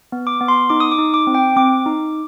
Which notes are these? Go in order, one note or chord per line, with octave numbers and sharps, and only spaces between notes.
B3
D6
B3
C6
D#4 D6
D#6
D6
D#4
D6
C4
G5
C4 D6
D#4